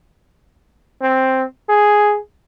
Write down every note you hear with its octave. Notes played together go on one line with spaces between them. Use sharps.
C4
G#4